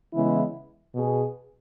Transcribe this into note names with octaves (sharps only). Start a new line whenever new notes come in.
C#3 E3 G#3 B3 E4
B2 B3 G#4